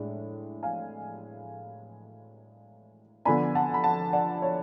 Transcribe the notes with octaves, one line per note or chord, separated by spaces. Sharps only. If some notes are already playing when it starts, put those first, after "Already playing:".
Already playing: A2 G#3 D4
F5 G#5
D3 F3 B3 D4 G#5 B5
F#5 A5
B5
F#5 A5
D5 F#5
C#5